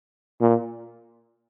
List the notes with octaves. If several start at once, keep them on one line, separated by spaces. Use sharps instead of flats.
A#2